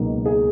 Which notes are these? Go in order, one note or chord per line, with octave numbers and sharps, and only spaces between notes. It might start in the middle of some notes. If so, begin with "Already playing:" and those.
Already playing: C#2 B2 F#3 A#3 D#4
G#4